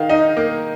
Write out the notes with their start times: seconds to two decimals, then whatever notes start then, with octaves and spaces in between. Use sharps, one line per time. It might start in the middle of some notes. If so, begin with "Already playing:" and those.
Already playing: D#3 F5
0.09 D#4
0.37 A#3